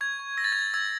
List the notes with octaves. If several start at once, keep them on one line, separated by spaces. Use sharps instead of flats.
C#6 G#6
C#6
E6 A#6
A6
G#6
C#6 A6
E6 G#6